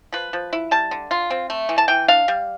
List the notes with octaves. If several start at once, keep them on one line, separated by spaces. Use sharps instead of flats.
F3 B4
F3
E4
G3 A5
D3
F4
C4
A3
E3
A5
E3 G5
D4 F5
G3